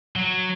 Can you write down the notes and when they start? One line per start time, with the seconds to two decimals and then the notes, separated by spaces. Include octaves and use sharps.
0.16 F#3